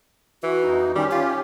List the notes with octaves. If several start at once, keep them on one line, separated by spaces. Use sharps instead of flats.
E3 F#4
F2 D#4
D#3 G3 C#4 G4
F4 C#5